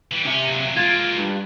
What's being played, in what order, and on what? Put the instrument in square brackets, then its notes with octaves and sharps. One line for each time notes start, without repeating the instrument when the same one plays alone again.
[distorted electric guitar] E3 G3
[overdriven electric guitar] C3 E5 [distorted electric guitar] C#4
[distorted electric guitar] A#2 F#3
[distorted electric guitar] G#3 A#3 [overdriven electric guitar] F4 [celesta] G#6 A6
[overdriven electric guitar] G2